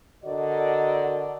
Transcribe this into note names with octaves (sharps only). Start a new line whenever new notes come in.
D3 F#4 A#4 D5 D#5